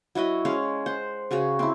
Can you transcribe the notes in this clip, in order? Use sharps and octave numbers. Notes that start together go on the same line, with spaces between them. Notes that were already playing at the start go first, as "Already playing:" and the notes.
F#3 E4 F#4 D#5
G#3 C#4 C#5 F5
C5 F#5
C#3 F#4 G#4 C#5
C4 E4